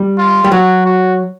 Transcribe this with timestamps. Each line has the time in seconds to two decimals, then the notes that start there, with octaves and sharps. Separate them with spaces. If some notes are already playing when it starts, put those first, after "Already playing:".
Already playing: G3
0.18 F4
0.44 G3
0.52 F#3 F#4
0.86 F#4